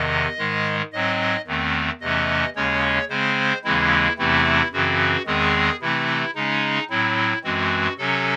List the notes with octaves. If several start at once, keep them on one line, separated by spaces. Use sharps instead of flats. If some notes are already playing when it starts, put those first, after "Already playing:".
Already playing: E2 C3 D#3 D#5
G#2 D#3 G#3
G#2 F#3 C4 D#5
E2 D#3 A3 C4
E2 C3 E3 A3 C#4 D#5
D#2 C#3 G#3 C#4 C#5
C#3 G#3 C4 C5
D#2 C#3 E3 G#3 C4 E4
E2 C3 E3 A3 C4 E4
F#2 C#3 E3 C4 F#4
E2 D#3 G#3 C4 G#4
C3 E3 A3 C4 E4
C#3 G#3 C#4 D#4
A2 F#3 C4 E4
F#2 E3 G#3 C4 F#4
C3 F#3 C#4 A4